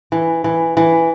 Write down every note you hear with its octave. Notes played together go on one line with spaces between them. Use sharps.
E3
E3
E3